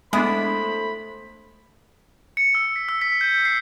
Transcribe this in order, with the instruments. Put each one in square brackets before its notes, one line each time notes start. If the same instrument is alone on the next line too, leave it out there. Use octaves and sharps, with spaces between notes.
[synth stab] G#3 B3 D4 [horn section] A3 C5 B5 [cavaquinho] E4 D#6
[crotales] C#7
E6
B6
E6
B6
G6
C7